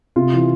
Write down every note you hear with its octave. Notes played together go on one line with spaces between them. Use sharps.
C3 F4
E3